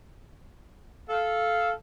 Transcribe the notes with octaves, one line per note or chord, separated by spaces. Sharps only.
A4 F5